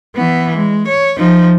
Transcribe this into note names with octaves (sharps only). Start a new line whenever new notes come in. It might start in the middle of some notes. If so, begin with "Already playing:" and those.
E3 B3
G#3
C#5
F3 D#4